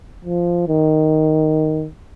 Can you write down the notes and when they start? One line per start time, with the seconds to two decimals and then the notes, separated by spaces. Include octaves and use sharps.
0.24 F3
0.68 D#3